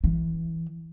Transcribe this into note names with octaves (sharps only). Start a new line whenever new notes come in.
E3